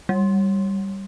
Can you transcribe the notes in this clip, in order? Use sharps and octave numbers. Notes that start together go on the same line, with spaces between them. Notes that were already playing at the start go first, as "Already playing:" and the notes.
G3